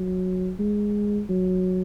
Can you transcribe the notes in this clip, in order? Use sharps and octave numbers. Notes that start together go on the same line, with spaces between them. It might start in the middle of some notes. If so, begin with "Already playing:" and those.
Already playing: F#3
G#3
F#3